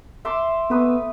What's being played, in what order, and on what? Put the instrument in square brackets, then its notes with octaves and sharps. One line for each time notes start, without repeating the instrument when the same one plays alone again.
[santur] E5 C6 D6
[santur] A3 B4 D#6 [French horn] B3